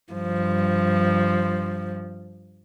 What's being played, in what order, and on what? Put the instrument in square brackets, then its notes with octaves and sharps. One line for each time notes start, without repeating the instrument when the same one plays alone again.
[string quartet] G2 F3